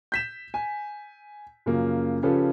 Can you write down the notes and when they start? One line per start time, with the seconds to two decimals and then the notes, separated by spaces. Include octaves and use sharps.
0.12 G6 B6 E7
0.54 G#5
1.66 F#2 C#3 F3 A#3
2.23 C#3 F3 C#4 G4 A4 B4